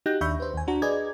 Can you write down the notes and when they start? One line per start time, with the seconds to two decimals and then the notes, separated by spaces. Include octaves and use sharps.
0.06 D#4 F#4 G4 F#6 G6 A#6
0.21 D#2 D4 E5 B5 C#6 G6
0.40 B4 C5
0.54 D#2 G#5
0.68 D4 F#4 A#5
0.82 G#4 B4 D5 D#5 G#6